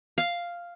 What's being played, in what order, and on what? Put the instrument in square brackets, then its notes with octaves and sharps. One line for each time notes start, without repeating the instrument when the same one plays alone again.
[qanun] F5